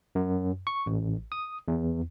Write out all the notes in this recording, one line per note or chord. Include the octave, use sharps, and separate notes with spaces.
F#2
C#6
A1
D#6
E2